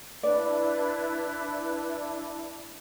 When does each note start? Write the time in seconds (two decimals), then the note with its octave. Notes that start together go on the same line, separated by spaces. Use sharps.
0.23 D4 E4 B4 D5